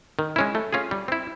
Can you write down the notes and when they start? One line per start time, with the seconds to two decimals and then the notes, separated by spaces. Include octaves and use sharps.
0.19 D#3
0.36 G#3 C#4 E4
0.55 A3
0.73 C#4 F4 G#4
0.91 G3
1.08 C4 E4